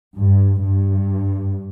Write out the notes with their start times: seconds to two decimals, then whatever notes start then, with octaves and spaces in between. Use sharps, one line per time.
0.17 G2
0.63 G2